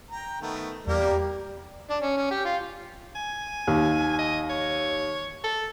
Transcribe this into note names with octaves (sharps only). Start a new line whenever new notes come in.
G5 A#5
D#3 A3 B3
E2 G3 A#3 G4 A#4
D4
C#4
C#4
G4
F4
G#5
D#2
D#5
C#5
A4